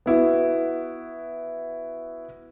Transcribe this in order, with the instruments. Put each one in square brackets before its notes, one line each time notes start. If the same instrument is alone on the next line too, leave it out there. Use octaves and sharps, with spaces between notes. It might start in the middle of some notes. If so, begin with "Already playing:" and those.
[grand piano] B3 E4 F#4